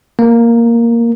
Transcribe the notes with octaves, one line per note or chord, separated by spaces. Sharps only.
A#3